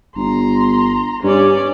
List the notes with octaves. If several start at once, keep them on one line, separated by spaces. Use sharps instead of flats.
G1 A#5 C6
G2 C#4 D5